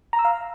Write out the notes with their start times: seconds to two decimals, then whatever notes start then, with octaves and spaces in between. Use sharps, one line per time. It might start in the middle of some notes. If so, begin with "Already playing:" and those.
0.13 A#5
0.19 E6
0.25 F5